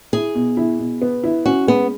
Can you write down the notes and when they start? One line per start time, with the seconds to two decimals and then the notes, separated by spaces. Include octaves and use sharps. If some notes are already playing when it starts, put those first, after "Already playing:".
0.13 E4 G#4
0.35 B2
0.57 E4
0.79 B2
1.01 B3
1.24 E4
1.46 C#4 F#4
1.67 G#3 B3